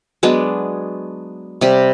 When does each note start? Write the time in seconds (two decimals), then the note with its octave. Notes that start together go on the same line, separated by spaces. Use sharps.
0.23 F#3 G#3 B3 D4
1.61 C3 G3